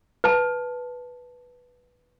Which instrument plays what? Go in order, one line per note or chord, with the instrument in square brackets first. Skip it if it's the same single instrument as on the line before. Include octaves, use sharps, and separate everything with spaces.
[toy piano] B4 A5